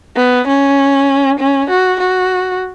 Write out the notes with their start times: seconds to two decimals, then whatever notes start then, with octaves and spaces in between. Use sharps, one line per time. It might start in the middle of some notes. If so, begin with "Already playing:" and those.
0.16 B3
0.48 C#4
1.39 C#4
1.70 F#4
2.00 F#4